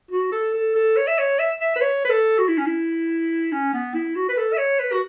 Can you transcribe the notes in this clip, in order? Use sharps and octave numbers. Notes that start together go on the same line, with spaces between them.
F#4
A4
A4
A4
C#5
E5
C#5
E5
E5
B4
C#5
B4
A4
F#4
E4
C#4
E4
C#4
B3
E4
F#4
B4
A4
E5
C#5
B4
F#4